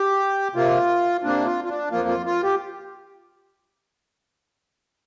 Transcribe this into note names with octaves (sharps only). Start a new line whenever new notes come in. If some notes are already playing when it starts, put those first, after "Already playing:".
Already playing: G4
C3 A#3 F4
C3 A#3 D4
F4
F4
D4
F2 F3 A#3 F4
F4
F4
G4